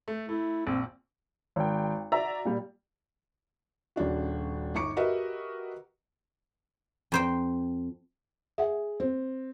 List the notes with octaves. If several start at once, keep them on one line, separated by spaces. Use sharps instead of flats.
A3
A3 E4
A#1 C4
G#1 G5
F#4 D5 E5 A#5
A#2 G3
D#1 C#3 D4 F#4
G1 D#4 C#6 D6 C#7
F#4 G4 A#4 B4 D#5 E5
F2 C5 G5
G#4 E5 F#5
C4